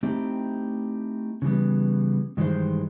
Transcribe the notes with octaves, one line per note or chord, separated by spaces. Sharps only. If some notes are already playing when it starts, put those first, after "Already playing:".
A3 C4 D#4 E4 G4
C#3 E3 G3 B3
G2 D#3 E3 G#3 G4 C5